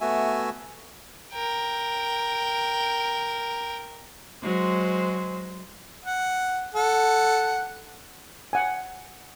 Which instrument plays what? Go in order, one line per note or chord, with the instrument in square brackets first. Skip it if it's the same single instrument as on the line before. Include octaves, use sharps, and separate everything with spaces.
[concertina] A3 B3 F#4 E5 G#5
[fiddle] A#4 G5
[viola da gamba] F#3 G#3 C5
[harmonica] F#5
A4 F#5
[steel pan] F#5 G#5